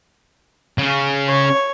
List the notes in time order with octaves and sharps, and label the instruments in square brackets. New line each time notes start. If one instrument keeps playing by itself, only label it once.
[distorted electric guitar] C#3 C#4
[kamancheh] C#5